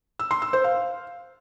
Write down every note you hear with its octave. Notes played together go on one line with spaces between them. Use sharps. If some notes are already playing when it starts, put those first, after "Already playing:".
E6
C6
E6
C5
F5